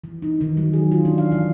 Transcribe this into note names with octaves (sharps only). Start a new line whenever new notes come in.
E3
D#4
D#3
F#3
G#4
F4
D4
F5
E3